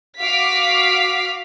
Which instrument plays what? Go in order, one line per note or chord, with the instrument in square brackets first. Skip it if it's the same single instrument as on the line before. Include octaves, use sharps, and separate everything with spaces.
[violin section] F#4 F5 D6 B6